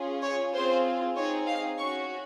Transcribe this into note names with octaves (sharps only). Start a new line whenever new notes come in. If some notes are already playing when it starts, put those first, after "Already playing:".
Already playing: C#4 F4 G#4
C#5
C4 F4 G#4 C5
C4 D#4 G#4 C#5
F5
C#4 F#4 C#6